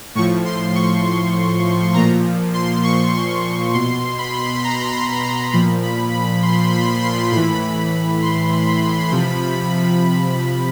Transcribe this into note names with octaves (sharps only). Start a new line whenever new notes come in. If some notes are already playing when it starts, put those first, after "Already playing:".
A2 F3 C#6
C6
C#6
C6
A#2 F3 A#5
C6
C#6
C6
C#6
B2 C6
B5
A#5
C6
A#5
A#2 F3 B5
B5
B5
C6
B5
C6
A2 E3 B5
C6
B5
C3 F3